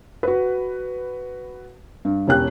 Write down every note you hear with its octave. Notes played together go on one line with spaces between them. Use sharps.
F#4 B4
G2
E1 B3 C#4 G4 G5 F#6